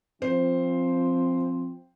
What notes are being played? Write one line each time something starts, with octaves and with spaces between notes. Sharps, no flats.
F3 C4 C5